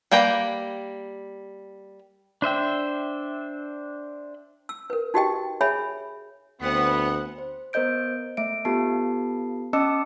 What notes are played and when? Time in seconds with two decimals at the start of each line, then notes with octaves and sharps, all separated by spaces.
0.11 G3 A#3 B4 G5 A#5
2.42 D4 C5 E5 G5
4.69 E6
4.90 A#4 B4
5.14 D#4 F#4 G4 D#5 G5
5.61 G#4 C#5 E5 G#5 B5
6.61 D2 B3 C4 F#5
7.38 C5
7.73 B3 A#4 C5 D#5 G6 D7
8.37 A3 E5 D7
8.65 B3 F4 G4 A4 A5 C7
9.73 C#4 D#5 A5 D6 E6 C#7